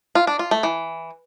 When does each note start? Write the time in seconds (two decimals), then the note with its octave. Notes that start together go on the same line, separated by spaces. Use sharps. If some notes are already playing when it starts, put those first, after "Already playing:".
0.15 F4
0.27 D4
0.39 F4
0.51 A3
0.63 E3